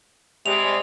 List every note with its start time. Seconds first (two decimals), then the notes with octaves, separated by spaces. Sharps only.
0.46 C3 G3 G#3 F7